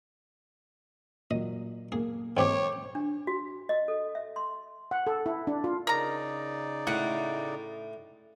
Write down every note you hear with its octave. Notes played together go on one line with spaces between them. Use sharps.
A#2 F#3 D#5
A#3 G#4
G#2 C4 G4 C#5 G5 D6
D4
F#4
D#5
A4
E5
C6
F#5
A4
E4
D4
F4
C#3 D#4 A#4 D5 A#5
A2 F#5